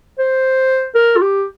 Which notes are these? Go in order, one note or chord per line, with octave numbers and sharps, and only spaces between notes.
C5
A#4
F4
G4